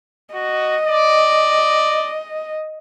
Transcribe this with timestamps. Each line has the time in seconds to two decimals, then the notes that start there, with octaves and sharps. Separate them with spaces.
0.35 F#4 D#5
0.85 D5